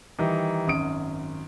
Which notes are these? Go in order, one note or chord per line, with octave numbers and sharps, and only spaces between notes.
D#3 E3 G3 D#4
G#1 F#2 D#6 D7